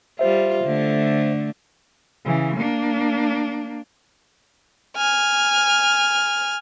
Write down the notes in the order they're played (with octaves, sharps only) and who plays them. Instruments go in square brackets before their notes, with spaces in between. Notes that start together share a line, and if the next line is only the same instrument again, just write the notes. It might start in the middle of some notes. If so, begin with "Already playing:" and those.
[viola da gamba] G3 F4 [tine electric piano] C5 E5
[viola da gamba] D3 A3
[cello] C#3 E3
A#3 D4
[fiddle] G#5 F6